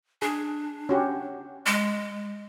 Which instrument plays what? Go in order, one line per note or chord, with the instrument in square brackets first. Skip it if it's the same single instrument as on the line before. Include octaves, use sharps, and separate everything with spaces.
[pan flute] D4 [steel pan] G#4
[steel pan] C#4 F#4 G4
[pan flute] G#3